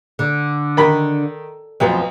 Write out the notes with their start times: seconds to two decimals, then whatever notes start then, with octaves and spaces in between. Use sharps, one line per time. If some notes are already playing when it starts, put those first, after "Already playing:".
0.19 D3
0.77 D#3 B5
1.80 B1 F2 F3 B3